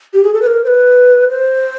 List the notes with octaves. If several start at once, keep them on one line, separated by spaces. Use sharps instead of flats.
G4
G#4
A4
B4
A#4
C5
B4
C5